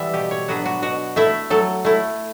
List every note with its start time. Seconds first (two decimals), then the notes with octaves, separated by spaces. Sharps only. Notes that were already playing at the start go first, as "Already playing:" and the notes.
Already playing: E3 G3 B3 D5 E5
0.14 B2 G4
0.31 C#5
0.48 F#3 B3 D4 F#4
0.66 F#4
0.82 B2 F#4
1.16 A3 E4 E5
1.50 F#3 A4
1.85 A3 E4